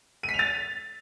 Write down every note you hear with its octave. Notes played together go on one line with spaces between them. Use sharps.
D#7
B6
F7
A6